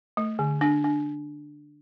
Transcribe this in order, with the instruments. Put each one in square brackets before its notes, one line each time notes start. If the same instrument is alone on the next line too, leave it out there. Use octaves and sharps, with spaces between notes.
[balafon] A3
D3
D4
D4